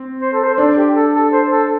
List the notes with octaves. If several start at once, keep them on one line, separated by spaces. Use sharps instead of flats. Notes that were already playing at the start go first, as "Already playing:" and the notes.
Already playing: C4
C5
A4
C5
C5
D4 A4
G4
A4
A4
C5
A4